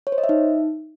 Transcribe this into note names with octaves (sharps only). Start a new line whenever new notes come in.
C#5
C5
D#5
E5
D#4